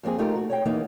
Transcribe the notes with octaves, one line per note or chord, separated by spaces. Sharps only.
F2 F3 A#3 C4 G#4
A3 D#4 F4 G4 A#4
F#4
C#5 D5 G5
E2 E3 A#3 B3 D#4